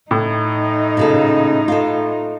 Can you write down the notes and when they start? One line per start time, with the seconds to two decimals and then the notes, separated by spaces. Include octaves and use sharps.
0.11 A2 D#4
0.97 A#2 C#3 A4
1.68 F4 A4